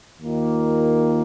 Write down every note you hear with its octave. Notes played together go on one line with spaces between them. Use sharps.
D#2 D#3 A#3 F4